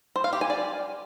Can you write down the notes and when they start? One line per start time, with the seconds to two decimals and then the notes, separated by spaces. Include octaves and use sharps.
0.16 C5
0.24 F5
0.33 G4
0.41 G#5
0.50 D5